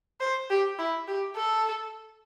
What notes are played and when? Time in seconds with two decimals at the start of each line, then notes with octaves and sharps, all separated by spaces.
0.20 C5
0.50 G4
0.79 E4
1.08 G4
1.36 A4